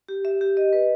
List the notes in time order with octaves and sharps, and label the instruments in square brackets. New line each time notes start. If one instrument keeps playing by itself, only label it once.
[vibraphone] G4
E5
G4
D#5
B4